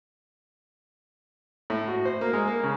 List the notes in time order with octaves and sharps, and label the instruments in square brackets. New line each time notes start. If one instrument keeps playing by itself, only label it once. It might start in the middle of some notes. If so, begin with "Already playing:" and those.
[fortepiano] A2
F#4
C5
A#3
G#3
A#3
C#3